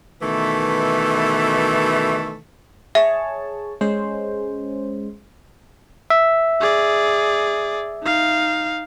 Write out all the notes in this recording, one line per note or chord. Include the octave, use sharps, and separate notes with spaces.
B2 D#3 E3 A3
G#4 C#5 E5 A5
G#3 C#4 C5
E5
G#4 D5
D#4 F5